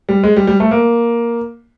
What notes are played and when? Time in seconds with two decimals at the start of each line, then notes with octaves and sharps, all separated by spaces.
0.09 G3
0.23 G#3
0.37 G3
0.47 G3
0.60 A3
0.71 A#3